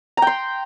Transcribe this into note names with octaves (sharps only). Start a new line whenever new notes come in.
G5 A#5 C6